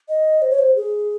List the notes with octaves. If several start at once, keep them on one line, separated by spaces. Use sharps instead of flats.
D#5
C5
C#5
C5
G#4